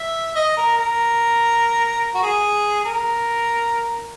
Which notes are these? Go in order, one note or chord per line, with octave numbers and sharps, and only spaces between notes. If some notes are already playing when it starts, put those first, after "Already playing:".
Already playing: E5
D#5
A#4
A#4
F#4
G#4
A#4